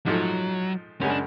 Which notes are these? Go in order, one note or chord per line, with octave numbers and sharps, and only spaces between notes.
G#2 F3 F#3 A3
F#2 C#3 G#3 C#4
D4